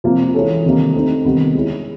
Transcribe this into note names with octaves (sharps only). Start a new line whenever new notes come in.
C3 F3 A#3
E3 G#3 C#4 F4 A4
C3 D#3 G3 A#3
A3 C4 D#4
C3 D#3 G3 B3
G#3 C#4 E4 G#4